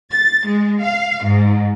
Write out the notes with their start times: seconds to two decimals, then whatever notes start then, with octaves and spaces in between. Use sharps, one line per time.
0.12 A6
0.47 G#3
0.81 F5
1.24 G#2